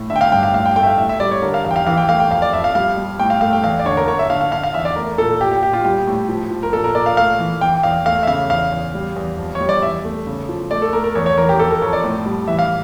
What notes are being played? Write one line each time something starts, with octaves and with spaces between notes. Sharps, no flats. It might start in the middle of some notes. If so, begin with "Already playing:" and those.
Already playing: A2
D3 E5
G5
F5
G2 G5
F5
A2 F5
G5
A3 G5
E5
F5
A2 E5
E5
G3 D5
C#5
D3 A#4
F5
E2 F5
G5
F5
E3 F5
G5
A3 F5
G5
F2 F5
D5
F2 E5
F5
G3 F5
G3
A2 G5
F5
A3 F5
G5
E2 F5
D5
D3 C#5
A#4
D3 C#5
E5
D3 F5
F5
D3 F5
F5
E2 E5
D5
A3 A#4
A#2 A4
A#2 G4
G4
A#2 G4
F4
G3 G4
A2
F3
F3
A#4
A#2 A4
A#4
A#2 D5
F5
A3 F5
E3
E3 G5
E2 F5
A3 F5
E5
C#3 F5
E2 F5
E2
G3
E2
F2
C#5
G3
D5
E2 E5
A3
C#3
F3
A3 D5
A4
A3 A#4
A#4
E2 C#5
C#5
E3 A#4
G4
F2 A4
A#4
F2 C#5
D5
A2
G3
E3 E5
F5